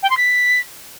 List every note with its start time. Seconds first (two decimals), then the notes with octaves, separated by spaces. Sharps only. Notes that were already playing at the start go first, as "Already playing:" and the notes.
0.03 G5
0.10 C6
0.17 B6